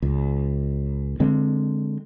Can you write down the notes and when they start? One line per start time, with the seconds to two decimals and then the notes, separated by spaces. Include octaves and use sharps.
0.02 C#2
1.20 D3 G#3 C4